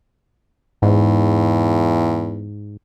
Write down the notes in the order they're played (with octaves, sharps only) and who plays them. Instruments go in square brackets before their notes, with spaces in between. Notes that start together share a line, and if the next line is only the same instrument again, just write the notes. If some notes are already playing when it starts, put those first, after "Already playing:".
[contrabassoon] E2 [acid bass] G#2